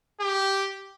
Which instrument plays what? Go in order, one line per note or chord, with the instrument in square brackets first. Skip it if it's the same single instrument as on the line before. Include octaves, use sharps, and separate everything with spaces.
[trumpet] G4